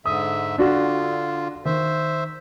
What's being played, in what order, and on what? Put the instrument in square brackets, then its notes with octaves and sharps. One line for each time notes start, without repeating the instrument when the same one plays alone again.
[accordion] G#2 D3 E5 [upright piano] D#6
[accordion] D3 F4 [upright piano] D4 F#4
[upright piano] D#3 [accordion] C5 E5